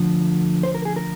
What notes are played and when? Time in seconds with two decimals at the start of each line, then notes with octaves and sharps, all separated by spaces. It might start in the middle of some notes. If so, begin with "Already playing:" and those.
Already playing: D2 D3 F3
0.63 C5
0.75 A#4
0.85 G#4
0.96 A#4